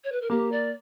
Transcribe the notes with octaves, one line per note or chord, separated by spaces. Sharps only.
C#5
B4
A#4
A#3 G4
D5